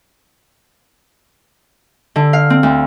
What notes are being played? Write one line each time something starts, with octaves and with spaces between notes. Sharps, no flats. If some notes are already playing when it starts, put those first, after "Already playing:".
D3
F5
C4
D2